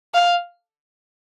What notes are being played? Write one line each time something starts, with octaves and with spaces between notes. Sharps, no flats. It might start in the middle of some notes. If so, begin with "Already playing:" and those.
F5